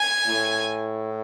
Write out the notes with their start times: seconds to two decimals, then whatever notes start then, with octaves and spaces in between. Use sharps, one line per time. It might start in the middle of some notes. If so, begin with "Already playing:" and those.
Already playing: G#5
0.27 A2